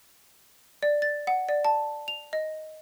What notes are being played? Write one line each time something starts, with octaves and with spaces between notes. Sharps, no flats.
D5
A6
F#5
D5
A5
F7
D#5